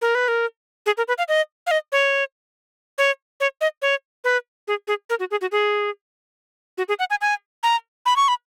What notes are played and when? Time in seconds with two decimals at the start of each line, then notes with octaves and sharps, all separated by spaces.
0.02 A#4
0.15 B4
0.28 A#4
0.86 G#4
0.97 A#4
1.08 B4
1.18 F5
1.28 D#5
1.67 F5
1.71 D#5
1.92 C#5
2.98 C#5
3.40 C#5
3.61 D#5
3.82 C#5
4.24 B4
4.68 G#4
4.88 G#4
5.10 A#4
5.19 F#4
5.31 G#4
5.41 F#4
5.52 G#4
6.78 F#4
6.89 G#4
6.99 F#5
7.10 G#5
7.21 G#5
7.63 A#5
8.06 B5
8.16 C#6
8.28 B5